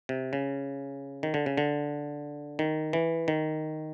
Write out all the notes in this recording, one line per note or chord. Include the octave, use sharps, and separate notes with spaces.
C3
C#3
D#3
D3
C#3
D3
D#3
E3
D#3